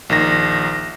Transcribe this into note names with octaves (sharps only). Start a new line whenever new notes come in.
A#1 D#3 A#6